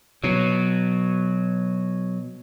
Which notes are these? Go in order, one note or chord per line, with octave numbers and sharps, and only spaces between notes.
B2 F#3